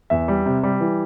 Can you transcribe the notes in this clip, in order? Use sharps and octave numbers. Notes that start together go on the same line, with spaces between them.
E2 E5
G3
C3
G3
E3